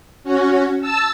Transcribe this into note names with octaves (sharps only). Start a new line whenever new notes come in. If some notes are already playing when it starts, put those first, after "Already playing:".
C#4 F#4
A5 E6